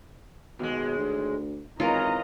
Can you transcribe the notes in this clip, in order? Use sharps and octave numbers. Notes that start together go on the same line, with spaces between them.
D#2 B2 G#3
D2
G#1 E3 C#4 F4 A#4 D#5 A#5